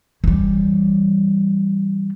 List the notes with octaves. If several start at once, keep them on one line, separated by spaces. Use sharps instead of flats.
E3 G3